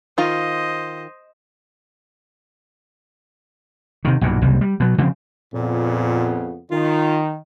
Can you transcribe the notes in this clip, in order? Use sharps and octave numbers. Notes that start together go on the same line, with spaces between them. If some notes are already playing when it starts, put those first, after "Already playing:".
D#3 F4 C5 D#5
C3 D#3
B1 G2 A#2
F#1 C2 C3 G3
G3
B2 F#3
C#3 F3 G3 C4
F2 A#2 C#3 B3
D#3 F4